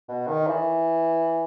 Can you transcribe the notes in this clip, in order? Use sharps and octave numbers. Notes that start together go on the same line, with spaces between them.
B2
D#3
E3